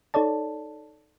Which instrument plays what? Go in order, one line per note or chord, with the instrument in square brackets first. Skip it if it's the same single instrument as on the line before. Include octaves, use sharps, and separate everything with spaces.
[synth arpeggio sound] D#4 A4 C#5 D5 A5